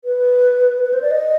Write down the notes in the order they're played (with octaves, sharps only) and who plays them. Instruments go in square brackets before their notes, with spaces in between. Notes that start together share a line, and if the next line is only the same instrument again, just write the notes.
[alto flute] B4
B4
C5
D5
D#5